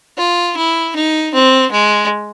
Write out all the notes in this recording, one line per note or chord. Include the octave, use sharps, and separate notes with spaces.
F4
E4
D#4
C4
G#3